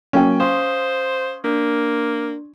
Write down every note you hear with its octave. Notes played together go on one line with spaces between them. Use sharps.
F#3 A#3 C#4 G5
C5 F5 C6 D#6
A#3 D4